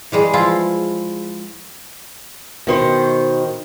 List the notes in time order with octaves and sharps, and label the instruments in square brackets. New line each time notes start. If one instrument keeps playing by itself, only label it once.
[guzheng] E3 G3 G#3
F3 E4 F4
[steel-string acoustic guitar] B2 D#3 C5